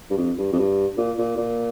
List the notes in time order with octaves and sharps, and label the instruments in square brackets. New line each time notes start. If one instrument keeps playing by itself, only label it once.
[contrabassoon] G2
F2
G2
F2
G2
A#2
A#2
A#2